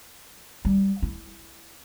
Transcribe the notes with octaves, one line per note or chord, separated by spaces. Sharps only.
G3
E4